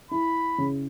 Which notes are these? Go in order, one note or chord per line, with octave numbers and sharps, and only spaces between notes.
E4 B5
C#3